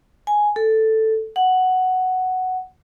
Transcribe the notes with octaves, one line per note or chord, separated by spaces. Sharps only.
G#5
A4
F#5